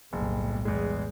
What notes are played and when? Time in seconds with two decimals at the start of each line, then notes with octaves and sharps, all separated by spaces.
0.13 F#1 B1 A2 G3
0.65 E2 G#3